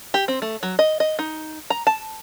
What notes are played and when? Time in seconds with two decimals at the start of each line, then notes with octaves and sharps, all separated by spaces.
0.14 G4
0.28 C4
0.42 A3
0.63 F#3
0.79 D#5
1.00 D#5
1.19 D#4
1.70 A#5
1.87 A5